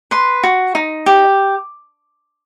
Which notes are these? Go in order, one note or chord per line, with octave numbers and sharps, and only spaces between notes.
B4 C6
F#4
D#4
G4